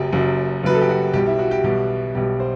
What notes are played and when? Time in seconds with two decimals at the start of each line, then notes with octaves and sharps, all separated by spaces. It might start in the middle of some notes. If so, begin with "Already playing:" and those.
Already playing: F#1 F#2 F#3 G4
0.13 F#1 F#2 F#3
0.63 F#1 F#2 F#3 B4
0.74 A4
0.81 G4
0.89 F#4
1.14 B1 B2 G3 G4
1.27 E4
1.39 F#4
1.51 G4
1.64 B1 B2 G3 G4
2.15 B1 B2 G3 G4
2.40 C5